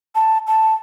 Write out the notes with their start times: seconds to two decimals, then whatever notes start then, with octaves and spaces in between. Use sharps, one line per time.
0.15 A5
0.47 A5